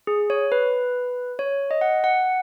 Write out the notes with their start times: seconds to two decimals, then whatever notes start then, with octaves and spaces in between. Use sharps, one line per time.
0.07 G#4
0.30 C#5
0.52 B4
1.39 C#5
1.71 D#5
1.81 F#5
2.04 F#5